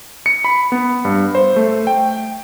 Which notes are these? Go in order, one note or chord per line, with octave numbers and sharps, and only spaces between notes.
C#7
B5
B3
G2
C5
A3
G5